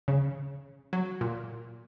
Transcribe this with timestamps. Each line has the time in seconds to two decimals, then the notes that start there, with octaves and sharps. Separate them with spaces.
0.08 C#3
0.93 F#3
1.21 A#2